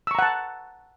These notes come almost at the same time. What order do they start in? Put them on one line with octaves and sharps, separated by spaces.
E6 C#6 A#5 F#5 A5